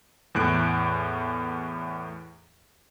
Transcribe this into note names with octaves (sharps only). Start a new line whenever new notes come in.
E2 A2 F#6 D7